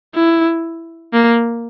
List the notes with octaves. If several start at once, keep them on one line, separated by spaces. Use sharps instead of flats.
E4
A#3